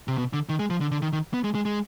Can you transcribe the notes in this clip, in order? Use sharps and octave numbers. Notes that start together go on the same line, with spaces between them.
C3
B2
D3
D#3
G#3
F3
D3
D3
D#3
D#3
B3
G#3
G#3
G#3